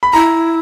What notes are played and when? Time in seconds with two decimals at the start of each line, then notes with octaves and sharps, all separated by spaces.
0.03 B5
0.13 E4 A#5